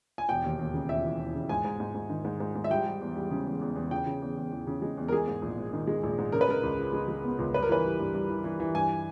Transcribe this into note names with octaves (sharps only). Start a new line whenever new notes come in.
G#5
E1 G5
D#2
D#2
C#3
E1 E5
E3
E1
C#3
G#2 G#5
G#2
G#2
G#2
D#3
G#2
G#2
G#2
E5
G3 G5
G3
E2
G3
C#3
E2
E2
E2
C#3 G5
C#3
E2
E2
E2
C#3
G#3
E2
A#4
G#3 G#4
G#2
A#1
G#2
D#3
G#3
A#1
G#2
C#3 A#4
B4
G#3 A#4
C#2
C#3
G#3
G#3
B3
C#2
G2 B4
A#4
E3 B4
G3
G2
G2
E3
E3
E3
G2 G#5